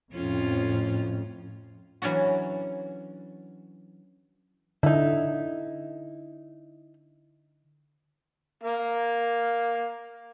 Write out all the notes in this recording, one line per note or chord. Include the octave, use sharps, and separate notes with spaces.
F2 A2 C#4 F4
E3 F#3 C#4 D4 F#4
D3 D#4 E4
A#3 F5